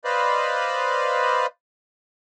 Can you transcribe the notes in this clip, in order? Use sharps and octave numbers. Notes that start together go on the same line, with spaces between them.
B4 C5 D5 D#5 F5 B5